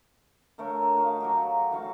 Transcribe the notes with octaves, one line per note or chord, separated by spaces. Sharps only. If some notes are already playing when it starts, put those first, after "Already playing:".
D3 A3 A#4 C#5
F#4 D#5 F5
F#3 F#4 G4
E3 F#4 F5 C#6